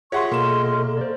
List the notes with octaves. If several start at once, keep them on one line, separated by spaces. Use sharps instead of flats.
F4 G4 G#4 C#5 E5 F#5 C6 C#6
B2 A#3 A4 D#5 C6 F6 E7
C5 D5